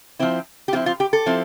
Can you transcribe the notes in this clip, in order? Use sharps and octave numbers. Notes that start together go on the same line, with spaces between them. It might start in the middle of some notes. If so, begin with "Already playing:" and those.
F3 C4 E4
G4
F3 C4 E4 F4
F4
G4
A4
F3 C4 E4